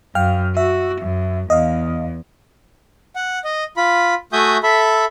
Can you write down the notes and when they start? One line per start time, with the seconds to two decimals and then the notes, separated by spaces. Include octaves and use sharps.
0.15 F#2 F5 G5 F6
0.57 F#4 E5
1.01 F#2
1.50 E2 D#5 F5
3.16 F#5
3.44 D#5
3.77 F4 B5
4.33 A3 F#4 E5 G#5 D#6 G6
4.63 A4 E5 B5